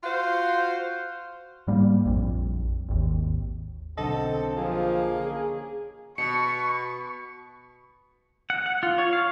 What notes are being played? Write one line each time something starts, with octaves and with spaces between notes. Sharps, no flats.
F4 F#4 C5 F5
G#2 G3 A#3
A#1 F2
G#1 D#2
B1 D3 C4 A4 D#5
F3 A#3 G#4
C#4 G#4
B2 C#6 C#7
F#5
F#5
F4
C#5
F5